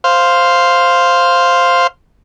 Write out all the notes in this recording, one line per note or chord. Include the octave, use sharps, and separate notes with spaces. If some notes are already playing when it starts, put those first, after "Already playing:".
C5 F5